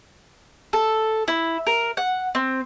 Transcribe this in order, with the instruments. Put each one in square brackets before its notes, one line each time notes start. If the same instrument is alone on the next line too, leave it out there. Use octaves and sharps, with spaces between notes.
[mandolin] A4
E4
A#4
F#5
C4